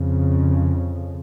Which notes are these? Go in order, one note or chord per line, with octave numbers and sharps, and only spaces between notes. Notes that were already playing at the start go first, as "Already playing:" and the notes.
Already playing: F2 C#3